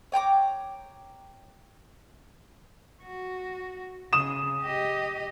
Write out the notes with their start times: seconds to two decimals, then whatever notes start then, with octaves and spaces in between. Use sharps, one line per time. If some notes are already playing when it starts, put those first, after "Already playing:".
0.12 C#5 G5 A#5 D6
3.04 F#4
4.13 C#3 D#6 E7
4.62 G4 D#5